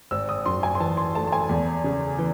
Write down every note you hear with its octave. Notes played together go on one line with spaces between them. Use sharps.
G#1 E6
D#6
F#2 C6
G#5
C6
E3 A5
C6
A3 A5
A5
G#5
E2
C#3
E3